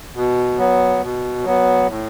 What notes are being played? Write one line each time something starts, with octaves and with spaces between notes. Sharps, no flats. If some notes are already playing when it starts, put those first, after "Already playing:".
B2
F#3 B3
B2
F#3 B3
A2